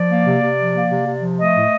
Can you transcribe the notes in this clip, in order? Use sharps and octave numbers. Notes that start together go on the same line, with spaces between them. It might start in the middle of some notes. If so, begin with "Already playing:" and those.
Already playing: F3 D5
A#3
C3
C3
F3
A#3
C3
C3
F3
A3 D#5
A2